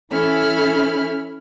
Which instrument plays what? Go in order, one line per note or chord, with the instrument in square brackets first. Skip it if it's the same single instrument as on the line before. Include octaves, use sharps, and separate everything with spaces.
[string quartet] E3 C#4 E4 A4 B5 F6